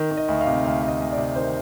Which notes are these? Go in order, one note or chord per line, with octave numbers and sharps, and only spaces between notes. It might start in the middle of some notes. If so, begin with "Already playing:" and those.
Already playing: D#3
D#3
D#5
D2
F5
C3
D2 F5
D2
D#5
D2
D5
C3
D#3 C5